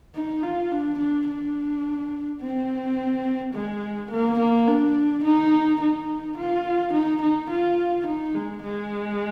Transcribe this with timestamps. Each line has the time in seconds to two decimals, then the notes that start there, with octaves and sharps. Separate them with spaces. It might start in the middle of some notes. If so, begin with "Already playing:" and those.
0.15 D#4
0.43 F4
0.72 D4
0.99 D4
1.28 D4
2.41 C4
3.54 G#3
4.11 A#3
4.39 A#3
4.68 D4
5.24 D#4
5.81 D#4
6.38 F4
6.93 D#4
7.22 D#4
7.50 F4
8.07 D#4
8.35 G#3
8.63 G#3